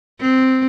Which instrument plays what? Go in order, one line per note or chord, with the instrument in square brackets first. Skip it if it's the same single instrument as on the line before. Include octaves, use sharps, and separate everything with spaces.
[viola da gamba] C4